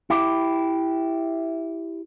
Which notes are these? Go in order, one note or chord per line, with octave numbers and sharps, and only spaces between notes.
E4 G4